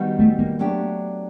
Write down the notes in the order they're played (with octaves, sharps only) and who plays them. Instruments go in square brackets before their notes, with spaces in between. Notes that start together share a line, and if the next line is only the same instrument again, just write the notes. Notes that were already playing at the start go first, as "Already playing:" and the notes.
Already playing: [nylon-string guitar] D#3 G3 B3 D#4 F#4
[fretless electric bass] A3
A#3
[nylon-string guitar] F#3 A3 D4 G4